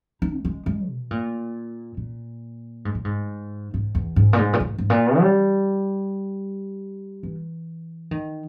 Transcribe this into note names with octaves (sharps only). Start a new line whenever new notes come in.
D#4
G3
G#3
G#3
B2
A#2
A#2
G#2
A#2
G#2
G#2
E2
G#2
A#2
G#2
A#2
G#2
G#2
A#2
G3
E3
D#3